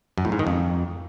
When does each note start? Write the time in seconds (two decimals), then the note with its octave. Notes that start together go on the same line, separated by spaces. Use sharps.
0.18 F#2
0.25 A2
0.32 G#2
0.39 D#3
0.47 F2